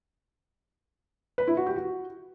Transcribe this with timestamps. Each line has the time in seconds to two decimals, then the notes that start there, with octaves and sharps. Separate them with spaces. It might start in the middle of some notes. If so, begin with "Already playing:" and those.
1.38 B4
1.47 E4
1.57 F#4
1.67 G4
1.76 F#4